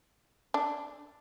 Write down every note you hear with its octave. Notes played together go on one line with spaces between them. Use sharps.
D4